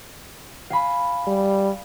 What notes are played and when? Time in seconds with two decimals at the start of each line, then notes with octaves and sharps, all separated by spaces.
0.70 F5 G#5 B5
1.27 G3